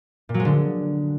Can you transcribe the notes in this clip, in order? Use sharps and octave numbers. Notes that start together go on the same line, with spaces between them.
A#2
F#3
G#3
D3